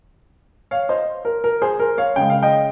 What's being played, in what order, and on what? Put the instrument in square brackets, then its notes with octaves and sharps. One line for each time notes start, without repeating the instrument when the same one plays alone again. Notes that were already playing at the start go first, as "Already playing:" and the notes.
[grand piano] C#5 F5
C5 D#5
A#4
A#4
G#4 C5
A#4
C#5 F5
C#3 G#3 G5
F5
D#5 G5